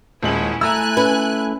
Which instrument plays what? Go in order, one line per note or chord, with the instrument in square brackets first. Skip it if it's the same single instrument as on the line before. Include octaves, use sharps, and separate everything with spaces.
[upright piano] D#1 G#3 F#7 [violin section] C#4 E4
[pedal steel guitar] A3 E4 [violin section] G#5 F#6 [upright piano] A#5 E6
[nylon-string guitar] C#4 B4